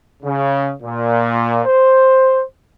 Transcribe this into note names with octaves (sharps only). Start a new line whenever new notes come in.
C#3
A#2
C5